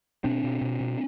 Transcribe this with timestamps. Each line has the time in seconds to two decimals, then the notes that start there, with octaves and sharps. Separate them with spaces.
0.24 B2 C4 D4
0.44 B2
0.61 B2
0.81 B2